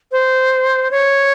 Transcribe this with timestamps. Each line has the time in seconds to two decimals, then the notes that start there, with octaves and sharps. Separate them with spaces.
0.12 C5
0.91 C#5